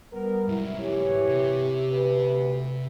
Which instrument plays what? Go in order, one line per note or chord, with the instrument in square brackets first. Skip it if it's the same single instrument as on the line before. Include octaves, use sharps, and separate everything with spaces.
[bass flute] G3 [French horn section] B3 A#4
[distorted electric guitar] G#2 F#3 [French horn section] E4
[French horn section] E3 C#5 [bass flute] G4
[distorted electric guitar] C3
[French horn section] D2 B4